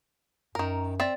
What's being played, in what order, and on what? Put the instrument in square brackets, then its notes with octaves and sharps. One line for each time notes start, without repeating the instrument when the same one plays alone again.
[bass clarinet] F#2 [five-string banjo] D#3 A#4
[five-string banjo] C4 E5 [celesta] D5 A6